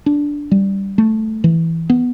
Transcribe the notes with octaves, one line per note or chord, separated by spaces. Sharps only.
D4
G3
A3
E3
B3